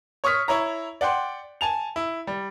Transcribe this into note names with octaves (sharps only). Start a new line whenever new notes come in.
C#5 C#6 D#6 F6 B6
E4 C#5 A#5
D5 F#5 G5 C6
G#5 A5 F7
E4
G3